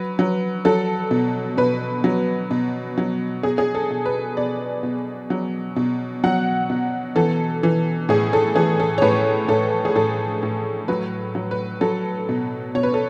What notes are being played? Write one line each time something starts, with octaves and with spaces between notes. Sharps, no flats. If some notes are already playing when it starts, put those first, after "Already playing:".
Already playing: F#3 B4
F#3
F#3 A4
B2
B2 B4
F#3
B2
F#3
B2 G#4
G#4
A4
B2
B4
B2 D5
B2
F#3
B2
F#3 F#5
B2
E3 A4
E3
A2 G#4
A4
E3 G#4
A4
C#5
A2 B4
A2 A4
G#4
A2 A4
A2
F#3 B4
F#3
B4
F#3 A4
B2
B2 C#5
B4
A4